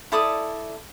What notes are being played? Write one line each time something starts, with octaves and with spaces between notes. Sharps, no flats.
E4 A4 D5 D#6